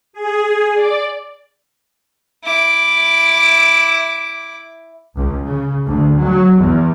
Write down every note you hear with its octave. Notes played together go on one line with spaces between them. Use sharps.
G#4
D5
E4 D6
C#2
C#3
D2
F#3
E2